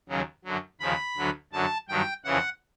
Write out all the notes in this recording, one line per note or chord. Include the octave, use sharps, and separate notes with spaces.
D#2 C#3 F#3
F#2 D3 F#3
D#2 C#3 F3 B5
D2 D3 F#3
F#2 D3 F#3 A5
G2 D#3 F#3 G5
F2 C#3 E3 F#5